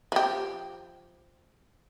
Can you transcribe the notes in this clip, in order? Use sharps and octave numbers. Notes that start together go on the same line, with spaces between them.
F3 G4